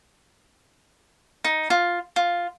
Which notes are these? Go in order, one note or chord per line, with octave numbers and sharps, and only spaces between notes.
D#4
F4
F4